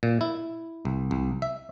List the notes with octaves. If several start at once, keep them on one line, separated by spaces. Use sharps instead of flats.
A#2
E4
C2
C2
E5